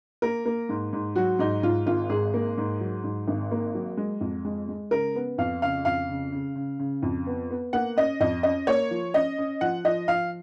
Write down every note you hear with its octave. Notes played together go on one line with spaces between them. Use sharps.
A#3 A#4
A#3
G#2
G#2
F#3 F#4
G#2 D#4
G#2 F4
G#1 F4
G#2 G#4
A#3
G#2
F#3
G#2
G#1
A#3
F#3
G#3
F2
G#3
G#3
C#3 A#4
B3
F2 F5
C#3 F5
F2 F5
C#3
C#3
C#3
C#3
F2
B3
B3
A#3 F#5
C#4 D#5
F2 D#5
C#4 D#5
A#3 C#5
F3
C#4 D#5
C#4
F3 F#5
F3 D#5
F3 F5